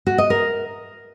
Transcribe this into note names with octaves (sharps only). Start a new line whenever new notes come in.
F#4
D#5
A#4